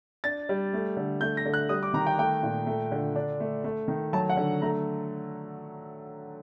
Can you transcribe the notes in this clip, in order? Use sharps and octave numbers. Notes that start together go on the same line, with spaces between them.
D4 A6
G3
A3
D3
A3 G6
A#6
D3
F#6
G3 D#6
D6
D#3 A#5
G5
A3 G5
A#2
A3
D3
D4
A3
A3
D#3
F#3 A5
F#5
D3
A3 A#5